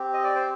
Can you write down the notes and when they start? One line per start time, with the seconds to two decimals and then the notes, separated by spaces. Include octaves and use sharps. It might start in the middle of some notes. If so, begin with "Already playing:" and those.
Already playing: C4 G4
0.13 D#5
0.24 D5
0.36 C5